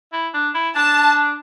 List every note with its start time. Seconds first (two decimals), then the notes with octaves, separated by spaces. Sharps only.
0.13 E4
0.34 D4
0.55 E4
0.76 D4 A5